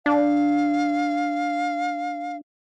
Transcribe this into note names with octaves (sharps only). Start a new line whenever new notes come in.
D4 F5